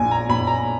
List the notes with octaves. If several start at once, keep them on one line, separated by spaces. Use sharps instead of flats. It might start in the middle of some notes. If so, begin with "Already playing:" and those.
Already playing: A#1 G#5
A#5
A#1 B5
A#5